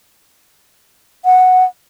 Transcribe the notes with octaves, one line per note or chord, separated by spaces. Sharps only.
F#5